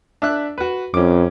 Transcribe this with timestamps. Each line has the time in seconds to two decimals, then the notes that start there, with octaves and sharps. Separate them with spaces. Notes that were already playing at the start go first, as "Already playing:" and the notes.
0.22 D4 E5 F#6
0.58 F#4 B4
0.94 F2 C#4 D6